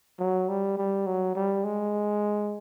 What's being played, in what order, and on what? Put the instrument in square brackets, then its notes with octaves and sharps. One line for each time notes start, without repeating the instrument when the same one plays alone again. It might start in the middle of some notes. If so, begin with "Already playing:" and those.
[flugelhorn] F#3
G3
G3
F#3
G3
G#3